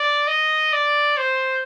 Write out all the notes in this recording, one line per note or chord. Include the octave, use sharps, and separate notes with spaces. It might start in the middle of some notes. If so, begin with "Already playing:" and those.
Already playing: D5
D#5
D5
C5